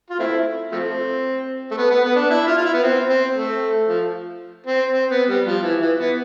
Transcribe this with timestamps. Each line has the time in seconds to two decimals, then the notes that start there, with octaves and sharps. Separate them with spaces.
0.10 F4
0.19 A3 C4 E4
0.72 F3 A3 C4
1.71 A3
1.77 B3
1.90 B3
2.04 B3
2.16 D4
2.30 E4
2.47 F4
2.58 F4
2.66 E4
2.74 B3
2.83 C4
3.09 C4
3.35 A3
3.88 F3
4.66 C4
4.93 C4
5.11 B3
5.29 G3
5.46 F3
5.63 E3
5.81 E3
5.99 B3